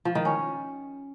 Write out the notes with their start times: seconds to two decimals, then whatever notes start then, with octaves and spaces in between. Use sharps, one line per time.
0.05 F3
0.15 D#3
0.25 C#4